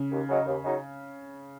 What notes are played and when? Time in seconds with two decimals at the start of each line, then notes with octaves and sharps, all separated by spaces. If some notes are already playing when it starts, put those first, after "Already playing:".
Already playing: C#3
0.11 D#2
0.29 C#3 F#3 D#4
0.46 D#2
0.64 C#3 F#3 D#4